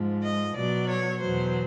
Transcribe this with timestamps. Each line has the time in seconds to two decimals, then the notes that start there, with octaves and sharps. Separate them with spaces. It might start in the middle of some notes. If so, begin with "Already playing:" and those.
Already playing: G#2 F3
0.22 D#5
0.54 B2 F#3 D5
0.87 C#5
1.20 E2 B2 F#3 C5